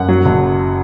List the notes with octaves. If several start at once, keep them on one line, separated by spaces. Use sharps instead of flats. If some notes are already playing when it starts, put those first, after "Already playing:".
Already playing: F#2 F#5
F#3
F#1